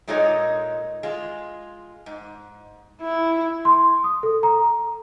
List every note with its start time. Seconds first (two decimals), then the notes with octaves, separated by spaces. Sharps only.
0.08 A#2 G#3 D#4 A4 C#5 D#5
1.03 G#3 F4
2.06 G#2
3.02 E4
3.65 C6
4.04 D#6
4.23 A4
4.43 A#5